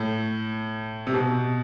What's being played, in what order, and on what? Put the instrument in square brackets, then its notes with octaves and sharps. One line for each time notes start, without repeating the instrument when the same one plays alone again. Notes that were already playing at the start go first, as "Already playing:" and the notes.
Already playing: [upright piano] A2
C3
B2